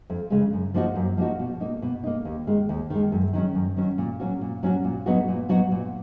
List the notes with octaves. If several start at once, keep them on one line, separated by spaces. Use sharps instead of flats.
F2
C#3 G#3
F#2
F3 A#3 D#4 F#4
F#2
F3 A#3 D#4 F#4
B2
A#3 D#4
B2
A#3 D#4
D#2
D#3 G#3
D#2
D#3 G#3
F#2
D#3 F#3 C#4
F#2
D#3 F#3 C#4
A#2
F#3 C#4 F#4
A#2
F#3 C#4 F#4
A#2
F#3 B3 D#4 F#4
A#2
F#3 B3 D#4 F#4
A#2